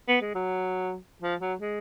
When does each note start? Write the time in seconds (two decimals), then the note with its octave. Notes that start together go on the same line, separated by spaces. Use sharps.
0.08 B3
0.21 G#3
0.34 F#3
1.22 F3
1.41 F#3
1.60 G#3